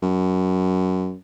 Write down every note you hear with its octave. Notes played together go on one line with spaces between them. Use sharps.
F#2